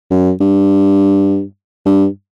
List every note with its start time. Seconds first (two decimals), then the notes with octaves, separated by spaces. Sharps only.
0.11 F#2
0.40 G2
1.86 G2